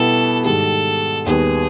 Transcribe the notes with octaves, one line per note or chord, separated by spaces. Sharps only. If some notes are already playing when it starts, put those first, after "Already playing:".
Already playing: B2 G3 B3 E4 G4 A4
G#2 D#3 G3 A4
D#2 D#3 G3 B3 G#4